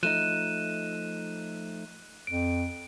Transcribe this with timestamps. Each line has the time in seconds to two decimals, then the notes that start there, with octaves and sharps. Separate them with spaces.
0.03 F3 A3 D#4 F#6 D#7 E7
2.27 F2 D7